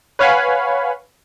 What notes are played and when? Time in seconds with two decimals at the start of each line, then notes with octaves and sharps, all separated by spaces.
0.19 B4 C#5 F5 F#5 G#5 B5